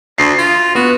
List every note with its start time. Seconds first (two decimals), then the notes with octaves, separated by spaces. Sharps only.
0.18 D2 C7
0.38 F4
0.75 B3 F#4